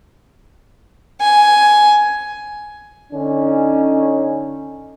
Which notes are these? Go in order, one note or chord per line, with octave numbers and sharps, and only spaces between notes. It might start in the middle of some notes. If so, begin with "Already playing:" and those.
G#5
D3 C#4 D#4